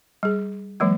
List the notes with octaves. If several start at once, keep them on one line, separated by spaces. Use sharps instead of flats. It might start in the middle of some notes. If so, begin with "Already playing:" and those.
G3 G#4
E3 F#3 G#3 A#3